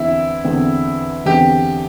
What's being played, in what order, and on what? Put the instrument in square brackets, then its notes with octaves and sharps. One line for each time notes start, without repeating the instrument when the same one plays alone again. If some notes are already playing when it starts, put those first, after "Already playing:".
Already playing: [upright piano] E2 D3 C4 [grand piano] E4
[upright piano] E2 D3 C4
[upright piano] E2 D3 C4 [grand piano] G4